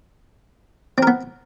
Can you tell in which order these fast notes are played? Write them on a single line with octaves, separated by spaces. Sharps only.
C4 A#4 B3